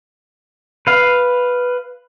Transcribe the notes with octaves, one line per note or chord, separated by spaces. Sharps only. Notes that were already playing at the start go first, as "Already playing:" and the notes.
B4 F5